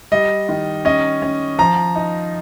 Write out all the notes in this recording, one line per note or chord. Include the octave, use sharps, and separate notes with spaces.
G3 D#5
D#3
C#4 D#5
C#4
F3 A#5
D#4